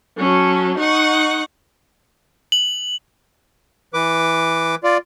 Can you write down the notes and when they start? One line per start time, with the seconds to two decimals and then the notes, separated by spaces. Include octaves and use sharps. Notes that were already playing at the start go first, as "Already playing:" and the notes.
0.18 F#3 C#4 A4
0.78 D#4 F#5 C#6
2.52 F#7
3.94 E3 B4 D6
4.84 F4 D5